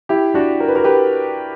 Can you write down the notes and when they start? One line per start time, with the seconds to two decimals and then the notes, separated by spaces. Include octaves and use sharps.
0.09 E4 G4
0.34 D4 F#4
0.60 A#4
0.68 B4
0.75 F#4 A#4
0.84 G4 B4